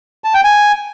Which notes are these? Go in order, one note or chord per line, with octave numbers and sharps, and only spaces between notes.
A5
G5
G#5